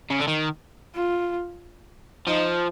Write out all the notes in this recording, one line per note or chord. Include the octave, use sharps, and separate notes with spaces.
C#3
D3
D#3
F4
F3 D#4